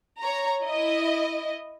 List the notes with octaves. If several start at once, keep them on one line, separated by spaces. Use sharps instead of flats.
C#5 A#5
E4 D#5